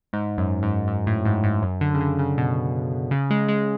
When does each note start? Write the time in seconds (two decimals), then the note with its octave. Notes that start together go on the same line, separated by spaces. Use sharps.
0.13 G#2
0.38 F#2
0.63 G#2
0.87 G#2
1.07 A2
1.25 G#2
1.44 G#2
1.62 F#2
1.81 D3
1.94 C#3
2.00 D3
2.19 C#3
2.37 B2
3.11 C#3
3.30 G#3
3.49 G#3